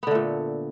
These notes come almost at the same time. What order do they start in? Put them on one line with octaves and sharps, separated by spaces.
B3 D3 A3 A#2